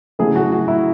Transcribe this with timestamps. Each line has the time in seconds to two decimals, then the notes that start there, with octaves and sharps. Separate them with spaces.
0.19 C#3 F#3 A3 E4 G#4
0.35 F#4
0.52 F#4
0.68 E4